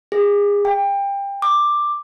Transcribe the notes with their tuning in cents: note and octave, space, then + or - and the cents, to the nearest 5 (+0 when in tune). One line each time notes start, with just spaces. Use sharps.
G#4 -30
G5 +25
D6 +10